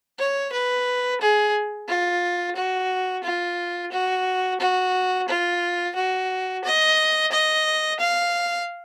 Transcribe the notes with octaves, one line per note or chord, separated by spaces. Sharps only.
C#5
B4
G#4
F4
F#4
F4
F#4
F#4
F4
F#4
D#5
D#5
F5